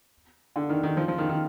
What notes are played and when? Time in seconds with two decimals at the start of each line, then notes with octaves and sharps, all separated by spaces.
0.56 D3
0.69 D#3
0.83 D#3
0.97 F3
1.08 F3
1.18 D#3
1.29 D#3